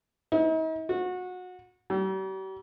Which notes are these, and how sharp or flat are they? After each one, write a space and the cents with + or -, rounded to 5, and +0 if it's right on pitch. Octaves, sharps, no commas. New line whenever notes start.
D#4 +45
F#4 -25
G3 -45